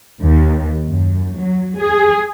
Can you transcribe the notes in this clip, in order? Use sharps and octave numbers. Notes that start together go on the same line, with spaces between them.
D#2
F#2
F#3
G#4